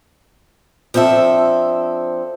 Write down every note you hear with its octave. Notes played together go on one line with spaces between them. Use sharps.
F3 C4 D4 A4 E5